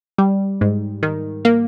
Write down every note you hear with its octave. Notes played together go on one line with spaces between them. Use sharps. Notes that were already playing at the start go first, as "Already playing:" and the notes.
G3
G#2
D#3
A#3